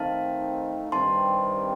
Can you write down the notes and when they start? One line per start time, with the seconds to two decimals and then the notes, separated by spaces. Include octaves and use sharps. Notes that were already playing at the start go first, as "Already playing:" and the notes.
Already playing: D#3 A3 C4 D#4 F5 A5
0.92 G2 D#3 G3 C4 A5 C6